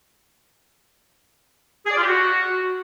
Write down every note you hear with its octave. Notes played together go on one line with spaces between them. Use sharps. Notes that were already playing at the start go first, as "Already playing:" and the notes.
G#4
D5
F4
G4
F#4